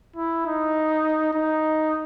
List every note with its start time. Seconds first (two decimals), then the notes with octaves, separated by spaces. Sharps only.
0.16 E4
0.46 D#4
1.34 D#4